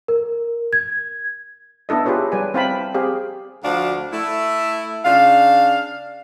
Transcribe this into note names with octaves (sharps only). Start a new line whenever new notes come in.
A#4
G#6
B3 D4 E4 A4 D#5
F4 G4 G#4 B4 C#5
G3 B4 D5 G#5
C4 E4 F5 G5 A5 B5
C4 G4 G#4 F5
D2 F3 D4 F#4 F5
A3 E4
C#3 D4 F5